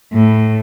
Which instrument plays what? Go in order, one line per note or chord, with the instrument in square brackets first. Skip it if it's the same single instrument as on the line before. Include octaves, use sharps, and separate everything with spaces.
[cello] A2